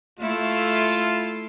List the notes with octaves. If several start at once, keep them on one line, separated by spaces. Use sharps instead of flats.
A3 E4 F4 A4